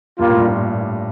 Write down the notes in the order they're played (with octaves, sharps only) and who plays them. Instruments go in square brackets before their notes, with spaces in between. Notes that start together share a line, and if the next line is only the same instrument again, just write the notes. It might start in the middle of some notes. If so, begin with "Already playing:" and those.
[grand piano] G2 [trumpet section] G3 A#3 F4
[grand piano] A2
G2
A2
A#2